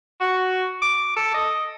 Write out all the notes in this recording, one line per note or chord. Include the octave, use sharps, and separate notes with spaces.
F#4
D6
A4
D#5